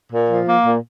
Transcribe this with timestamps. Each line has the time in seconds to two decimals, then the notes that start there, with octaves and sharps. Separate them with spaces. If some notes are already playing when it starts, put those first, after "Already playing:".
0.12 A#2
0.29 F3
0.47 A#3
0.65 A#2